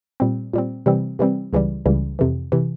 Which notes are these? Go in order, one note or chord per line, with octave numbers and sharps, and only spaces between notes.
A#2 G3 C4
A#2 G3 C4
C3 E3 G3 C4
C3 E3 G3 C4
C#2 C#3 E3 G3
C#2 C#3 E3 G3
F2 C3 E3
C3 E3